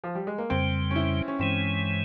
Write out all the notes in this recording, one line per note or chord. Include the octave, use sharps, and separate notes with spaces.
F3
G3
G#3
A#3
F2 C#3 G3 C4
C#4
E4
C#4
G2 E3 G#3 C4